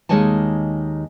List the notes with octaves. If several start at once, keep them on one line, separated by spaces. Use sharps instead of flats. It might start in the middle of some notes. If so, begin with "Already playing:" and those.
D#2 D#3 G#3 C#5 G#5 A5